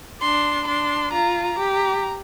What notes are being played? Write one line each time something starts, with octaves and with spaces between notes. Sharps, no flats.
D4 C6
D4 C6
F4 A#5
A#5
G4
A#5